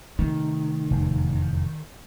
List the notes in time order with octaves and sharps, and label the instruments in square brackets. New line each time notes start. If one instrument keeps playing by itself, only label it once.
[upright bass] C3 A3 [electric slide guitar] D#3
[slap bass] F1 E2 A2